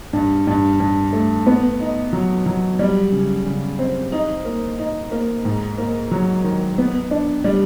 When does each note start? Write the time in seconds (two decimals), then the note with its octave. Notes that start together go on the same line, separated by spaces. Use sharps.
0.13 G2
0.47 G2
0.80 G2
1.13 A3
1.46 B3
1.80 D#4
2.13 F#3
2.46 F#3
2.79 G3
3.12 C#3
3.46 C#3
3.79 C4
4.12 D#4
4.45 A#3
4.79 D#4
5.12 A#3
5.45 G#2
5.78 A#3
6.11 F#3
6.44 D#3
6.78 B3
7.11 D4
7.44 G3